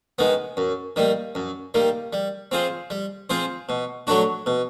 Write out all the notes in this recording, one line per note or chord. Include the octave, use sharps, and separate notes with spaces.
D#3 G#3 B3
F#2
D#3 G3 A#3
F#2
D#3 G3 A#3
G3
C4 F4 G#4 C5
G3
C4 F4 G#4 C5
B2
F#3 A3 D4 F#4
B2